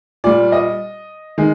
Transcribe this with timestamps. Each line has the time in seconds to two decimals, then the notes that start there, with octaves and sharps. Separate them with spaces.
0.24 A#2 G3 D5
0.52 D#5
1.38 D#3 G#3